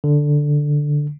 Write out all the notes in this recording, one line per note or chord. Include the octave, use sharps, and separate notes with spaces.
D3